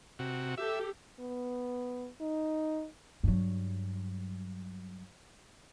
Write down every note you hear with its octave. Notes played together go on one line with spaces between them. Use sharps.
C3 F#4
G4 A4 E5
B3
D#4
G2 F#3